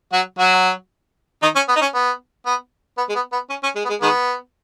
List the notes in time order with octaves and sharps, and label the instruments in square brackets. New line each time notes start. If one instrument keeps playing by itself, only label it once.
[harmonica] F#3 F#4
F#3 F#4
D#3 D#4
C#4
B3
D#4
C#4
B3
B3
B3
G#3
B3
B3
C#4
C#4
G#3
B3
G#3
D#3 G#3 B3